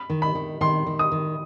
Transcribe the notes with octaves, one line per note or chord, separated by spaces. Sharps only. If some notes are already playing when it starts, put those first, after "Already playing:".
Already playing: B5
D#3
B5
D#3
D#3 C6
D#3
D#6
D#3